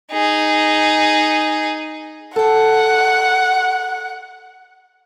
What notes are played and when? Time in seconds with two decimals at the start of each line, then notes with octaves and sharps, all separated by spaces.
0.12 D#4 G#4
2.36 A4 F#5 G5